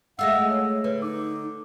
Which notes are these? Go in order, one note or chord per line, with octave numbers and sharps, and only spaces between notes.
G#3 A3 F4 F#5 E6 A#6
C#5
D3 B4
D#4 D6